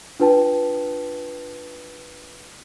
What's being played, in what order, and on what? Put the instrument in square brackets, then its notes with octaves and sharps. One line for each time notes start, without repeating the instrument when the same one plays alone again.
[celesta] D4 F4 B4 G5 A5